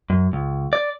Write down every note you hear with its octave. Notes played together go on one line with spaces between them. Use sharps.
F#2
C#2
D5